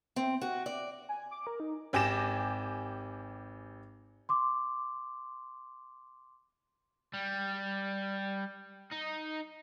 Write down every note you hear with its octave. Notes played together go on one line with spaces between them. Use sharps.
C4
F#4
D5
G#5
D6
A#4
D#4
G#1 G4 G#5 D6 A#6 E7
C6 D6
G3
D#4